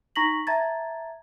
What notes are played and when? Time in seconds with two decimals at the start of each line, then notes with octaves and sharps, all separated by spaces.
0.16 D#4 A#5 C#6 A#6 B6 F#7
0.47 E5 A5 A#5 G#6 A6